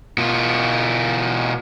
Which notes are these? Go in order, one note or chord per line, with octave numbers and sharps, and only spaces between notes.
B2 F4